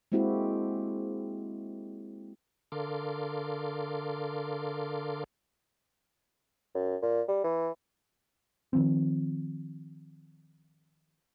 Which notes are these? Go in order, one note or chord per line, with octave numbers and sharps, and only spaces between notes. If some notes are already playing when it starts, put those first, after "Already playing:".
G#3 A#3 C4 E4 F#4 G4
D3 A4 A#4 F5 C6 D6
F#2
A#2
G3
E3
D#3 F3 C4